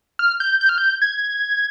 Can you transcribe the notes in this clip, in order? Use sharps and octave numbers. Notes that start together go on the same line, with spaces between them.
F6
G6
G6
F6
G6
G#6